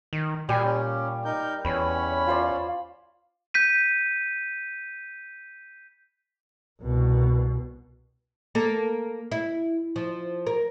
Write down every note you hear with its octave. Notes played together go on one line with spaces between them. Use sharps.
D#3
A#2 G3 G5 G#5
C#4
D#4 A#4 G6
E2 C#4 B4 C#5 B5
F4 C5 D5
G6 B6 D#7
C2 B2
A#3 A4
E4
F3
A#4